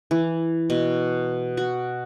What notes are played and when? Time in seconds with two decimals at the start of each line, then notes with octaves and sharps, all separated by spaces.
0.11 E3
0.70 B2
1.57 F#4